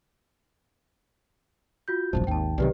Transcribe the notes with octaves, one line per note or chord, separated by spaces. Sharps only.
F4 F#4 G6
E1 A#1 F#2 C5 A5
G#1 D#2 G5 A5
B1 C3 D#3 G4 B4 D5